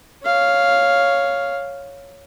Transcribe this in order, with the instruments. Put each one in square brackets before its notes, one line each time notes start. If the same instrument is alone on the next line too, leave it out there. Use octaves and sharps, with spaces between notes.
[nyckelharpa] C#5 F5